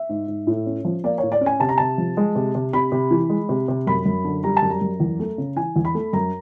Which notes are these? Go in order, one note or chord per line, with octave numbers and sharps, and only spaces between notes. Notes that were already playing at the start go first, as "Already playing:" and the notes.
Already playing: E5
G#2
G#2
A2
C#4
F3
A#3 D5
A2 C#5
D5
C#4
G#5
C3 A5
A#5
C3 A5
F3
G#3
C3
C3
C3 B5
C3
E3
G#3
C3
C3
F#2 B5
F#2
D3
G3 A#5
A5
F#2
A#5
F#2
E2
A3
C#3
E3 G#5
E2
B5
A3
F#2 A#5